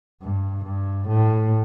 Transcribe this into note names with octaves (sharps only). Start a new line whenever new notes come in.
G2
G2
A2